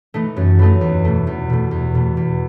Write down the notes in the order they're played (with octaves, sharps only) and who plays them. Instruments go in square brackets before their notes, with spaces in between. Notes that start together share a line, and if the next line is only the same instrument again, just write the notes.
[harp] E3 A3 D#4
F#2
E3 A3 D#4
E2
B2 A3
E2
B2 A3
E2
B2 A3
E2